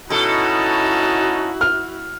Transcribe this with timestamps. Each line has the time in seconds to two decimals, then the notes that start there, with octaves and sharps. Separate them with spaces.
0.10 B2 C#4 D#4 E4 F#4 A4 A5
1.61 F6